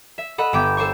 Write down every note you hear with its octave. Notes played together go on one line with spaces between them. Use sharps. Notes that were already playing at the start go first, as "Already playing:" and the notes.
E5
A4 D#5 F#5 B5
G1 G2 B3 G5 D6 G6
A4 C5 G5 C#6